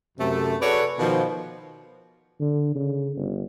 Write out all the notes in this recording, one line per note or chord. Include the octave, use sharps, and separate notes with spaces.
F#2 C3 A3
F#4 G#4 A4 B4 C#5 D5
B2 D#3 F3
D3
C#3
G1